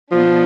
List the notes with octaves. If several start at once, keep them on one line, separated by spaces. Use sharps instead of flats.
B2 F3 B3 D4